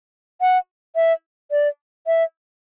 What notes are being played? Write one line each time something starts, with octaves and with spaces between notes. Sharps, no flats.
F#5
E5
D5
E5